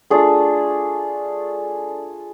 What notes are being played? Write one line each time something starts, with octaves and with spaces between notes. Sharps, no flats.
A3 D4 F4 G#4